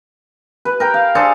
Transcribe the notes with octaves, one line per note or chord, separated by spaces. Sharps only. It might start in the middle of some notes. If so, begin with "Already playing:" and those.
B4
A#4 G5
F5
D4 G#4 A4 C5